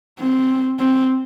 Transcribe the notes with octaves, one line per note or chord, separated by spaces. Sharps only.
C4
C4